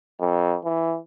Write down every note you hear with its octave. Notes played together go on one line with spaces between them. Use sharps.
F2
E3